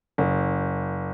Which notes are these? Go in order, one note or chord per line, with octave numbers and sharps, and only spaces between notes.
F#1